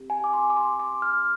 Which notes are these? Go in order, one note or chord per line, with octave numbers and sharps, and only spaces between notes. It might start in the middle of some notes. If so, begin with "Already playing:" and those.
Already playing: C4 G4
G#5
D6
C6
D6
C6
D6
F6